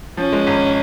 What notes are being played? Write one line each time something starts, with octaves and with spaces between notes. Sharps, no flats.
F3 C#4
G#3
G#1